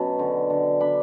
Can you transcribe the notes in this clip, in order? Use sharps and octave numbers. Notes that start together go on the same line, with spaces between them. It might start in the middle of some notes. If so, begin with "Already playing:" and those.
Already playing: B2 F#3 C#4 A5 B5
D3
D3
D4 B5